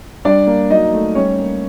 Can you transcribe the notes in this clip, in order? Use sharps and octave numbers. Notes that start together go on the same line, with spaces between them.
G3 D4 D5
A#3
F#3 D#4 D#5
A3
G3 C#4 C#5
A#3